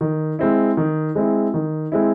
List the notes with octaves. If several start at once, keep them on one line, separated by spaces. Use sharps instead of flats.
D#3
G#3 C4 E4
D#3
G#3 C4 E4
D#3
G#3 C4 E4